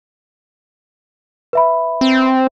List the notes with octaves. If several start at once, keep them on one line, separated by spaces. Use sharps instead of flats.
B4 E5 B5
C4